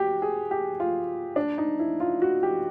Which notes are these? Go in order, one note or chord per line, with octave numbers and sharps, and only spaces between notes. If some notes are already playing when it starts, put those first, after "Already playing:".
Already playing: F#4 G4
G#4
G4
F4
D4
D#4
E4
F4
F#4
G4